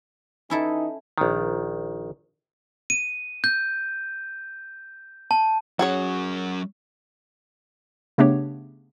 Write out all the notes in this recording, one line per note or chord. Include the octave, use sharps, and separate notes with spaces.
E3 C#4 D#4 E4 A4
A#1 D#3
D#7
G6
A5
F#3 C#4 F#4 G#4 C#5
C#3 A3 B3 D4 G4 C#5